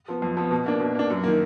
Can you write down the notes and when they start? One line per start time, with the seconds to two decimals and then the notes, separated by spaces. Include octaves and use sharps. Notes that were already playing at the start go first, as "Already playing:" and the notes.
0.08 F3 B3
0.22 F2
0.37 F3 B3
0.51 B2
0.66 A#3 D4
0.80 B2
0.95 A#3 D4
1.10 F#2
1.23 D#3 A#3